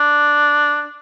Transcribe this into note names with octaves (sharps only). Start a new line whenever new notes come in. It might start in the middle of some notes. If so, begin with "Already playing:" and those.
Already playing: D4